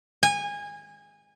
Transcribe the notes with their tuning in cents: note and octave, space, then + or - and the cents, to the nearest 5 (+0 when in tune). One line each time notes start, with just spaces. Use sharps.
G#5 -25